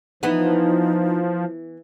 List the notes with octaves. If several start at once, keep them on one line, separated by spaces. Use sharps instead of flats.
E3 F3 B3 D#4